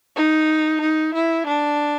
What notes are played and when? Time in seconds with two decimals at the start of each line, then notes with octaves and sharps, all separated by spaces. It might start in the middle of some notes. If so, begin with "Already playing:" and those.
0.16 D#4
0.81 D#4
1.14 E4
1.47 D4